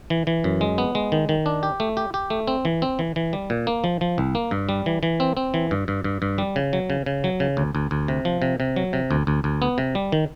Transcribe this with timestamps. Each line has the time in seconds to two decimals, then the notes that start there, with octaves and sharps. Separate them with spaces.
0.10 E3
0.27 E3
0.44 F#2
0.61 G#3
0.78 B3
0.95 G#3
1.12 D#3
1.29 D#3
1.46 D4
1.63 G4
1.80 A3
1.97 G4
2.14 G4
2.30 A3
2.48 C4
2.65 E3
2.82 C4
2.99 E3
3.16 E3
3.33 G3
3.50 A#2
3.67 A#3
3.84 F3
4.01 F3
4.18 C2
4.35 A#3
4.51 G2
4.69 G3
4.86 E3
5.03 E3
5.20 C4
5.37 C4
5.54 E3
5.71 G2
5.88 G2
6.04 G2
6.22 G2
6.38 G3
6.56 C#3
6.73 F#3
6.90 C#3
7.06 C#3
7.24 F#3
7.40 C#3
7.57 D2
7.75 D2
7.91 D2
8.08 C3
8.25 F3
8.42 C3
8.60 C3
8.76 F#3
8.93 C3
9.11 D2
9.27 D2
9.44 D2
9.62 B3
9.78 C3
9.95 G3
10.12 D#3